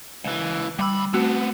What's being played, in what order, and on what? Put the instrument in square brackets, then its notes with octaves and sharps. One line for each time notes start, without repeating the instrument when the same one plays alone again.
[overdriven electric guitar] C#2 E3
[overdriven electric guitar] D2 B5 [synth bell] G3 E6
[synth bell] A3 F#4 [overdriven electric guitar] B3 C4